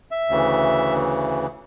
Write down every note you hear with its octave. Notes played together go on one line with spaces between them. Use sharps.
E5
D2 C#3 E3